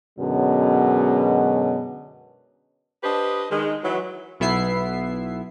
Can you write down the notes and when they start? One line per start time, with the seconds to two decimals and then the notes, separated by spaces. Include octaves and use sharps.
0.19 F#2 B2 D3 G#3 C#4
3.04 D4 G4 B4 C5 D#5
3.51 D#3 G#3
3.84 E3 F#3
4.40 B1 B3 E4 E5 C7